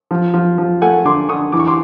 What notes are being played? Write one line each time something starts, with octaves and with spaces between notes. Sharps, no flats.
F3
F3
F3
A3 F#5 G#5
D3 C6 D6
D3 C#6 D#6
E3 D6
C#6
C6 D6